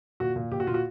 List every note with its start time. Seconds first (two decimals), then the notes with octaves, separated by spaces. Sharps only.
0.20 A#2 F#4
0.36 A#2
0.52 A#2 G4
0.60 F#4
0.67 A#2 F4
0.74 F#4